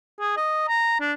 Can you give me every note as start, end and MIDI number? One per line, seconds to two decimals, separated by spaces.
0.20 0.32 68
0.37 0.66 75
0.68 0.97 82
1.00 1.13 62